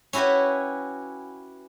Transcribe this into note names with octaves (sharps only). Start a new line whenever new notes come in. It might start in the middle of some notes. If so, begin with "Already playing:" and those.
C#4 E4 F#4 G4 B4